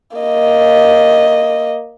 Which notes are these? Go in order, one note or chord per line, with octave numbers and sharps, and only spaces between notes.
A#3 D#5